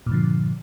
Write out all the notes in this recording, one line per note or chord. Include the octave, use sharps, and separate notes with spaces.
G2 A#2 D3 F3